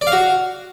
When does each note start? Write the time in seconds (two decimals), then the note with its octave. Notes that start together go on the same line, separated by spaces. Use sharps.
0.01 D5
0.07 F5
0.12 F#4